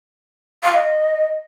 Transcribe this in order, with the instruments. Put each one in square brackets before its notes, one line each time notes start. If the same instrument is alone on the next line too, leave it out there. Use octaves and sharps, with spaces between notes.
[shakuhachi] F5
D#5